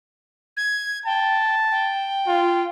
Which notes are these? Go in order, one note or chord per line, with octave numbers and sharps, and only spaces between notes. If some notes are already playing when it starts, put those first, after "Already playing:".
G#6
G5 A5
G5
F4